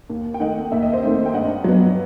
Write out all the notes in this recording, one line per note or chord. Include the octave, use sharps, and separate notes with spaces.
D#2
G5
D#3 A3 D#5 F#5
D#2 E5
D#5
C5 E5
D#3 A3 C4
G5
G2 D#5 F#5
F#3 B3